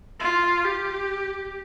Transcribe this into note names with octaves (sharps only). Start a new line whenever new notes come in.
F4
G4